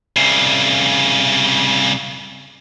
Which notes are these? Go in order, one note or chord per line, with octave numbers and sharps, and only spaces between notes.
C2 C#3